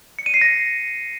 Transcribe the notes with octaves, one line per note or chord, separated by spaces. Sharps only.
C#7
D#7
C7
A#6